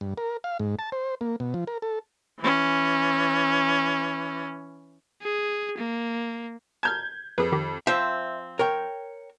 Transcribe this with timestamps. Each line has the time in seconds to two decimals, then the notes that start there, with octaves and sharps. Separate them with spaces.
0.01 G2
0.18 A#4
0.44 F5
0.59 G#2
0.79 A5
0.92 C5
1.21 A#3
1.40 B2
1.54 F3
1.67 A#4
1.82 A4
2.39 E3 C#4
5.22 G#4
5.77 A#3
6.83 A5 A#5 F6 G6 G#6
7.38 F2 G#4 B4
7.52 D#3 G4
7.87 F3 C4 E5
8.59 A#4 C#5 G5